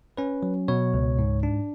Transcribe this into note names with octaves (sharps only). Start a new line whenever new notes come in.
C#4 B4
F#3
B2 C#5
C#2
G#2
D4